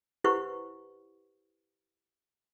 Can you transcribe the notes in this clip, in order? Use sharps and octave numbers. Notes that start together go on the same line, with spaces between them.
E4 G4 B4 C5 F#5 C#6